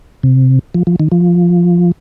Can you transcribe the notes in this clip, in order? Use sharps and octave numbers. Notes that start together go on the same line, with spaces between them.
C3
F3
F3
D#3
F3